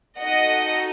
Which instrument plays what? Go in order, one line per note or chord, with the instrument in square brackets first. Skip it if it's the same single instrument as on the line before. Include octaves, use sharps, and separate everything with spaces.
[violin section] D#4 F#4 A4 D#5 F#5